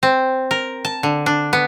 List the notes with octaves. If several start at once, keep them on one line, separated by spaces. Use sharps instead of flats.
C4
A#4
A5
D3
D4
B3